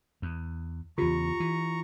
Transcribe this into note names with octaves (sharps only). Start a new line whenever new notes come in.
E2
E2 C#3 F4 G4 A#5 C#6
E3